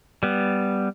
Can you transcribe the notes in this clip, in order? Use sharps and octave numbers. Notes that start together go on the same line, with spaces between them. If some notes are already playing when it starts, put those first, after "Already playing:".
G3 B3